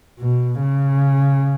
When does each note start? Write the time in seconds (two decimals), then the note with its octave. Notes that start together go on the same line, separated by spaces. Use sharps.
0.20 B2
0.61 C#3